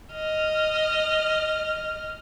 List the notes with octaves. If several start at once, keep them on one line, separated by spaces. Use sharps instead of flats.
D#5 F6